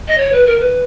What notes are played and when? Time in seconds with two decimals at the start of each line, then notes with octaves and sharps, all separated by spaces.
0.08 D#5
0.18 C#5
0.32 B4
0.47 A#4
0.60 B4